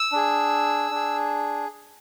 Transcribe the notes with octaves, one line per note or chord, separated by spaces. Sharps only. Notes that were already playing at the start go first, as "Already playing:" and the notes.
Already playing: E6
D4 G#4
D4 G#4